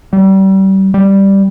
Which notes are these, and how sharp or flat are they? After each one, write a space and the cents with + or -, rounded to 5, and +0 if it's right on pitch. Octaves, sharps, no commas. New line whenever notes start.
G3 -30
G3 +0